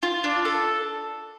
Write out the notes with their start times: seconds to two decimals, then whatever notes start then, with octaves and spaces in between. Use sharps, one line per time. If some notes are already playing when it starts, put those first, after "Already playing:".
0.03 F4
0.24 D4
0.45 A4